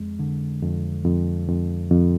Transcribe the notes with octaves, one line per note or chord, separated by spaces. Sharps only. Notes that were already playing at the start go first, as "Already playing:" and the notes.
Already playing: F2 G#3
D3
F2
F2
F2
F2